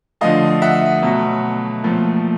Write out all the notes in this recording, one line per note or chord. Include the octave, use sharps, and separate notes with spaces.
D3 F3 A3 D#5 F5
E5 F#5
B2 F#3 A3
A#2 F3 A3